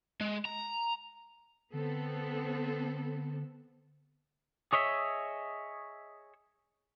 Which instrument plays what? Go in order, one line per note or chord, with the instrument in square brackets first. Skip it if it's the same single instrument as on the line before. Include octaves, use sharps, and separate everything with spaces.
[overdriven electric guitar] G#3
A#5
[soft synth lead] D3 [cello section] B3 C4 A4
[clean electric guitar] G#4 C#5 D#5 E5